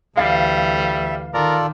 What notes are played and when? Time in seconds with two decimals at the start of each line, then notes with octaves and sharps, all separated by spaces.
0.17 D2 E3 G3 E5 F5 A6
1.34 D#3 F4 A4 A#4 D5